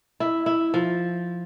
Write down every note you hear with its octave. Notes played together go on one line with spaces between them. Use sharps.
E4
E4
F3